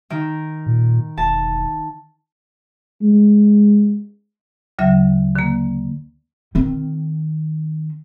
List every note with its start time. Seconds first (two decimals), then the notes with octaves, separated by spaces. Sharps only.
0.10 D#3
0.66 A#2
1.18 E1 A5
3.02 G#3
4.79 D2 C#3 F#3 E5
5.35 D3 A#3
6.55 D#3 C4